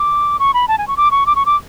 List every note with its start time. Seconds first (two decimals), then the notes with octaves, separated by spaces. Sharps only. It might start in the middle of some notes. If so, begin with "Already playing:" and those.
Already playing: D6
0.39 C#6
0.54 B5
0.68 A5
0.78 G#5
0.88 C#6
0.97 D6
1.11 C#6
1.26 D6
1.36 C#6
1.46 D6